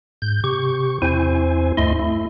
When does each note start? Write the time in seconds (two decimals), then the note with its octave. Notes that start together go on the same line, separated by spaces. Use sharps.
0.22 G#2 G6
0.44 C3 G4 C#6
1.02 E2 C4 E4 C5 G#5
1.77 D2 G2 A3 E4 D#5 C6
1.99 A3 E4